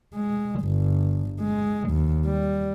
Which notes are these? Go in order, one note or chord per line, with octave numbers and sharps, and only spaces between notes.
G#3
G1
G#3
D#2
G3